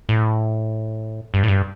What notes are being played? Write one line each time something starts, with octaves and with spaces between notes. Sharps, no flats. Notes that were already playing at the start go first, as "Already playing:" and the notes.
A2
G2
A2
G2